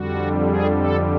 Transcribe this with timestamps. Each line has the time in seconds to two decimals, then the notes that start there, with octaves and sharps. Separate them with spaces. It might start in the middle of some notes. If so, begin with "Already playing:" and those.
Already playing: F2 D3 G3 F#4
0.46 G#4
0.76 A4